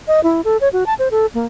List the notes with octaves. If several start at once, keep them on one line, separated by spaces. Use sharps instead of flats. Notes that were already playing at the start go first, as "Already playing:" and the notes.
D#5
E4
A4
C#5
F#4
A5
C5
A4
A#3